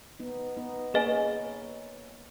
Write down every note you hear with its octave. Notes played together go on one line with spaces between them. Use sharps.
B3 D#4
B3 D#4
A#3 C#4 G#4 B4 D#5 G#5